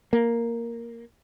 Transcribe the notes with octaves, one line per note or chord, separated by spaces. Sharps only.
A#3